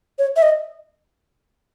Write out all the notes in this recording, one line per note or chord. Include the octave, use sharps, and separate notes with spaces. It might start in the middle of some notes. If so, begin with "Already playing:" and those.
C#5
E5
D#5